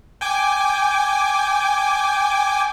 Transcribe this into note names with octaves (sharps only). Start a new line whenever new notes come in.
G5 G#5 D6